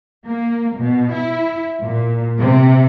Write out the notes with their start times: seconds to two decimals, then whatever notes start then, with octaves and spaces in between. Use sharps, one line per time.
0.26 A#3
0.78 B2
1.13 E4
1.82 A#2
2.40 C3